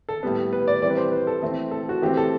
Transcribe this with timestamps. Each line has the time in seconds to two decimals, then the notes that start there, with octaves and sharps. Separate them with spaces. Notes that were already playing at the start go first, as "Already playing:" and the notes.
0.09 A4
0.23 A2 G3 B3
0.53 B4
0.68 D5
0.82 E3 G3 C4 D5
0.90 B4
0.97 C5
1.12 B4
1.27 A4
1.42 E3 A3 C4
1.71 A4
1.89 F#4
2.02 E3 A3 C4 G4
2.17 A4